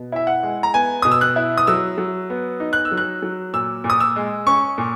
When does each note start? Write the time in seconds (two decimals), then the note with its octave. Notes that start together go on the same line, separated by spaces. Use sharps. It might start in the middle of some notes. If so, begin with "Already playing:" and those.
Already playing: B2
0.12 E4 E5
0.27 F#5
0.43 G#3
0.63 A#5
0.74 B3 G#5
1.02 B2 D#6
1.12 E6
1.21 F#6
1.36 E4
1.58 D#6
1.67 F#3 E6
1.98 F#3
2.30 B3
2.60 D#4
2.73 F#6
2.85 E6
2.92 F#3
2.98 F#6
3.22 F#3
3.53 A#2 E6
3.84 A#2
3.90 D#6
4.00 E6
4.16 G#3
4.47 C#4 C#6
4.78 A#2